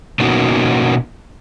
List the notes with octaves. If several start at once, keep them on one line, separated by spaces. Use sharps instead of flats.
B2 A#3 B3 C#4 D#4 F#4